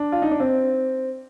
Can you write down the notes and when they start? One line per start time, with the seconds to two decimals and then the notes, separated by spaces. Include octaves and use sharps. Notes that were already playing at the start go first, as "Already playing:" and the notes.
Already playing: D4
0.12 F4
0.22 D#4
0.31 D4
0.40 C4